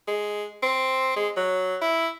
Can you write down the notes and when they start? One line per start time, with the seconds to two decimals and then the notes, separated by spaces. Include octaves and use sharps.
0.08 G#3
0.63 C4
1.16 G#3
1.37 F#3
1.82 E4